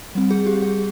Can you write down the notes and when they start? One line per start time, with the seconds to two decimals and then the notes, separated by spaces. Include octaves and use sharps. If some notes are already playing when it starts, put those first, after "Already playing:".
0.15 G3 C4
0.31 G#4
0.47 G4
0.62 G#4